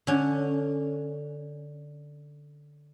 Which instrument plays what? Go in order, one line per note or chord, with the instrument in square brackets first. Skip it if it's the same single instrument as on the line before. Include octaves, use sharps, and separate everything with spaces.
[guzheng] D3 C#4